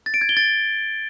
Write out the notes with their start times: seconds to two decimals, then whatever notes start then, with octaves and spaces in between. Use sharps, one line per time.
0.06 A6
0.14 D7
0.21 G#6
0.29 G7
0.37 A6